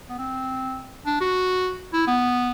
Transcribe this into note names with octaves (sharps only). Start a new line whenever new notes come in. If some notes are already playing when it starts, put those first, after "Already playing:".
B3
C4
D4
F#4
E4
B3